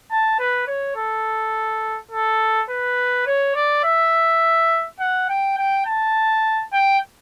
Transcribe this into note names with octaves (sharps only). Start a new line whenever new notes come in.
A5
B4
C#5
A4
A4
B4
C#5
D5
E5
F#5
G5
G5
A5
G5